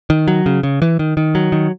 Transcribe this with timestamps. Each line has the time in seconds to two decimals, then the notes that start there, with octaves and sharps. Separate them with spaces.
0.10 D#3
0.28 F#3
0.46 C#3
0.63 C#3
0.82 E3
0.99 D#3
1.17 D#3
1.35 F#3
1.52 D#3